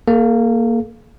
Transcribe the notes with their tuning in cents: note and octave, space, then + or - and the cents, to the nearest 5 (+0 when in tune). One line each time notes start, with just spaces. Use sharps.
A#3 -5 G#4 +45